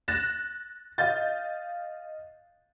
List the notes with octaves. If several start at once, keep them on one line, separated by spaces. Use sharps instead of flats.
F#6 A6 A#6 E7
D#5 F5 G6 A6